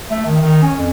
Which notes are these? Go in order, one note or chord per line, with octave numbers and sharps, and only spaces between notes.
A3
D#3
D#3
C#4
F2